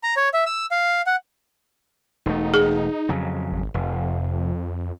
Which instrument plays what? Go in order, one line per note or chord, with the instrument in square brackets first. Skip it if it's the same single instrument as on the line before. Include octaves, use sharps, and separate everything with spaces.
[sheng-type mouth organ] A#5
C#5
E5
E6
F5
F#5
[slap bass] E1 A3 [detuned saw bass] D#4
[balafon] G#4
[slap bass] F2 C#3 F#3
[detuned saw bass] G#1
[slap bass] F1 [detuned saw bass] F2